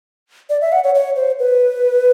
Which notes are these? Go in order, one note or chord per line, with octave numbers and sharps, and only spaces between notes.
D5
E5
F#5
C#5
C#5
C5
B4